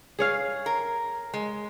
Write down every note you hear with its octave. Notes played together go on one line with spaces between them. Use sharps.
G#4 C#5 F5
A#4
G#3